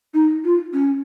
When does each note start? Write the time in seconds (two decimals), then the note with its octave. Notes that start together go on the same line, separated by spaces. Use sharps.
0.14 D#4
0.44 F4
0.73 C#4